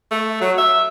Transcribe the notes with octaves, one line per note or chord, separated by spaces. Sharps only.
A3
F#3
E5